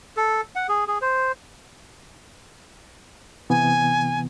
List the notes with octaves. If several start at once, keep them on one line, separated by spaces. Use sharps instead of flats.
A4
F#5
G#4
G#4
C5
C3 E3 B3 G#5